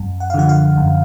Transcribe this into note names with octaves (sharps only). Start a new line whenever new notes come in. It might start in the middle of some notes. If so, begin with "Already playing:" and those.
Already playing: F#2
F#5
F5
D3 F3 F#5
F5
F#2